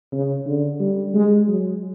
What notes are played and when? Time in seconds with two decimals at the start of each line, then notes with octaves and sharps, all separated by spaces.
0.12 C#3
0.46 D3
0.80 G3
1.14 G#3
1.48 F#3